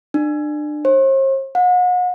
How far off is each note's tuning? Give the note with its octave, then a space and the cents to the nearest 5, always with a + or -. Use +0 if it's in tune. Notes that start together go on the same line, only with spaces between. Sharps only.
D4 +30
C5 +45
F#5 -40